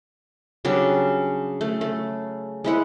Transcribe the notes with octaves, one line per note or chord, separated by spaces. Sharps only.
C#3 F#3 G3 D4
A3
A3
G#3 E4 F#5